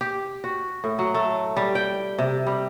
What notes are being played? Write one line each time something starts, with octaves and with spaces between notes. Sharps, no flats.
G4
F#4
A2
F#3
A3
G3
G5
C3
G3